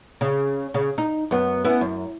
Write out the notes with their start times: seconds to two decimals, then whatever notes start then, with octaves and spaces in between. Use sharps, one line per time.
0.21 C#3
0.74 C#3
0.98 D#4
1.31 F#2 B3
1.65 B3 C#4 E4
1.81 F#2